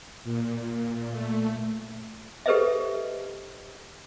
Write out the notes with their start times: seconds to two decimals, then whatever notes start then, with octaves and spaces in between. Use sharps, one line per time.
0.24 A#2
1.11 A3
2.46 G4 A4 B4 C5 D#5 E5